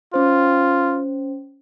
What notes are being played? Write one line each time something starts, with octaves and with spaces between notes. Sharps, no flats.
C#4 F4 C5